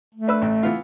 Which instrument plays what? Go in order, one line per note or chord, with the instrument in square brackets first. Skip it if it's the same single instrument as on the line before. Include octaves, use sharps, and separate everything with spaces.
[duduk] A3
[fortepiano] D4 B4 E6
A1
E3 B3 F4